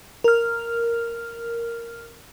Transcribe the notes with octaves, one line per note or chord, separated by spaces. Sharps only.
A#4 F6